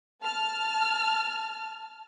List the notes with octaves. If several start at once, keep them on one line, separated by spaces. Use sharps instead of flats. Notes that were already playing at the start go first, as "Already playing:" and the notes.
A5 F6